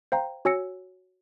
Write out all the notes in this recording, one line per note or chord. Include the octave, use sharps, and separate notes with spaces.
C5 F5 G5 A#5
F#4 C#5 G#5 E6 A#6 C#7